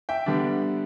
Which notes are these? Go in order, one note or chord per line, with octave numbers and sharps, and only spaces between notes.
E5 G5
D3 G3 B3 D4